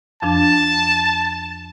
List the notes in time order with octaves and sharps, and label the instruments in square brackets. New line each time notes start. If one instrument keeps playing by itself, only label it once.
[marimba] F2 F3 D4 [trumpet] A5